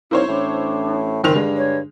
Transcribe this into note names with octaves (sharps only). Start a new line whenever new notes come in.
C2 A#3 D#4 E4 C5 C#5
A1 A2 D4
F#1 D#3 C4 F7
G2 D3 G#3
C#5